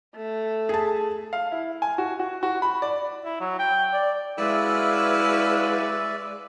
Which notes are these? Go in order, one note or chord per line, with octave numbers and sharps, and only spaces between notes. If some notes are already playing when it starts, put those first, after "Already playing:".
A3
G#4 A5
F5
E4
G#5
F#4
F#4
F#4
B5
D5
E4
F#3
G5
D5
G#3 C#4 E4 F#4 B4 D5 E5 F5